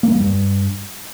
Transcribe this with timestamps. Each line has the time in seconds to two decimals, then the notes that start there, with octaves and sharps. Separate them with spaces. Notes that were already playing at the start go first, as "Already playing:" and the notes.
0.03 A#3
0.12 G3
0.20 G2